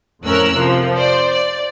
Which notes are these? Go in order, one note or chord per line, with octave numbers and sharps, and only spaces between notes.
F2 A2 C#4 A#4 E6 F#6
C3 F3
C5 D5
D5